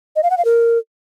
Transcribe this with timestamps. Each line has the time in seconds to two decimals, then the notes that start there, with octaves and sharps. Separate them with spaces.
0.16 D#5
0.23 F5
0.30 F#5
0.38 F5
0.45 A#4